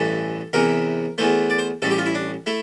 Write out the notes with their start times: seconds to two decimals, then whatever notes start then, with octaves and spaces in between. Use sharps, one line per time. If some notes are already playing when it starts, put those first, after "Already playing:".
Already playing: A1 G2 E3 A4
0.53 E2 C3 E3 A#4
1.18 E2 E3 A3 C5
1.50 D5
1.59 C5
1.82 A1 A2 G3 A4
1.91 G4
1.98 F4
2.06 E4
2.15 D4
2.46 A3 E4